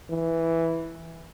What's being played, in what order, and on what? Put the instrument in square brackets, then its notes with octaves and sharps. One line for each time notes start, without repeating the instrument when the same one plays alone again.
[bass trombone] E3